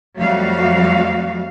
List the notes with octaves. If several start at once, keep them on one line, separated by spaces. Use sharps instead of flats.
F2 F#3 G3 A3 F#4 F5